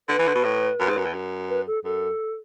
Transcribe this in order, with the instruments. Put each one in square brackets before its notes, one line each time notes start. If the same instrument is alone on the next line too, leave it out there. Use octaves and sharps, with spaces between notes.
[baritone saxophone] D3 [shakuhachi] B4
[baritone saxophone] E3
D3
B2
A2
F#2
G#2
F#2
E2
F#2
[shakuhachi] B4
A4
[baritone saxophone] F#2 [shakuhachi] A4